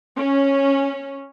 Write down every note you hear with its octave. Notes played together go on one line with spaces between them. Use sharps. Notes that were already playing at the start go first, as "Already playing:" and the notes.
C#4